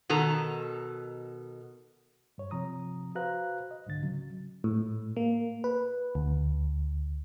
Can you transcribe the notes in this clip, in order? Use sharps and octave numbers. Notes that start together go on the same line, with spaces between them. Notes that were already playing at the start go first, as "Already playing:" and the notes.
B2 D#3 A4 A#5
G2 C#5
C3 F3 A#5 D#6
F#4 B4 C5 F5 A#5 F#6
D#5
C2 G#2 D3 A6
C#3 F#3
A2
A#3
B4
D2